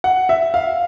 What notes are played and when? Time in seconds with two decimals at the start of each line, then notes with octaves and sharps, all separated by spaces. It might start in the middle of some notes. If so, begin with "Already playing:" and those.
0.04 F#5
0.29 E5
0.54 F5